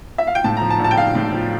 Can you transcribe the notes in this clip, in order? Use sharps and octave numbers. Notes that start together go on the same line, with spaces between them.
E5
F5
G5
A2 A5
A#5
F3
A5
A#1
A5
G5
A#1 F5
A2
F3